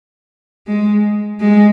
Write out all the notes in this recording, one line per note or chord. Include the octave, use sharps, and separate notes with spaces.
G#3
G#3